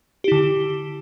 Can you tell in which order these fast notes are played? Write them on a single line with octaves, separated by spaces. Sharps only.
G4 E4 D3